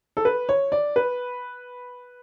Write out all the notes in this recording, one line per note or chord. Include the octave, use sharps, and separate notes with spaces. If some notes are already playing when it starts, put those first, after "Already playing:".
A4
B4
C#5
D5
B4